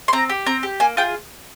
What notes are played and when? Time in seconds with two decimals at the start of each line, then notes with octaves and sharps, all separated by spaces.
0.08 C6
0.13 C4 A#5
0.30 G4
0.46 C4 A#5
0.63 G4
0.80 A#3 G#5
0.97 F4 G#4 G5